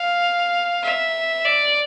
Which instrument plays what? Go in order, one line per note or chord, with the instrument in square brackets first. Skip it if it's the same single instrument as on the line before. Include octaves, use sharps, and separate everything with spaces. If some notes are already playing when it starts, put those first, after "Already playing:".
Already playing: [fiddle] F5
E5
D5